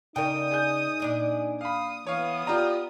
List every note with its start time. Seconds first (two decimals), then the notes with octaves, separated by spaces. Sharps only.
0.16 C#3 D4 D#4 A#4 G5 D#6
0.51 G#4 G6
1.00 A#2 D4 D#5
1.61 F5 B5 D#6
2.06 E3 B3 C#5 F5 D#6
2.47 F4 G4 D5 A#5